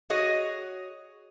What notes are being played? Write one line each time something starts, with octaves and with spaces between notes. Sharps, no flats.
F#4 G#4 C#5 D#5